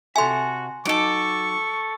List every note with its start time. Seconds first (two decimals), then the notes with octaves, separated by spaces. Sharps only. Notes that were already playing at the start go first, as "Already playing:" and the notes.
0.16 C3 F#4 A4 E5 G#5 C6
0.85 F#3 D#4 A4 C#6 D6